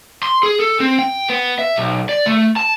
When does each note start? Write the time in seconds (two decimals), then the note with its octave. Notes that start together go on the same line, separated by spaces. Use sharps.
0.23 C6
0.43 G#4
0.60 A4
0.80 C4
0.99 G5
1.29 B3
1.59 E5
1.76 B1
2.09 D5
2.26 A3
2.56 A5